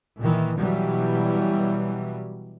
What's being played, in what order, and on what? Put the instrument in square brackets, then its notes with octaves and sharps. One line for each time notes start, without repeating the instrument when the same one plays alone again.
[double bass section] A#2 D#3 E3
B2 E3 F#3 G3